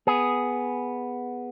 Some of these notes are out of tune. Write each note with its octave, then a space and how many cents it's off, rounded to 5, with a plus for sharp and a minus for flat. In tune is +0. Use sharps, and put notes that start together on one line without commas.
B3 +0 G#4 +0